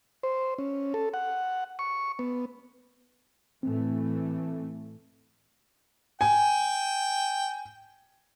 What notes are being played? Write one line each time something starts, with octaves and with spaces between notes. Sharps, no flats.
C5
C#4
A4
F#5
C#6
B3
A2 E3 A3 C4
G5 G#5